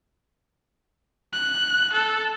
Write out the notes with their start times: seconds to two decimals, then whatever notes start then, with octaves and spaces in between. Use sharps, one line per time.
1.33 F#6
1.93 A4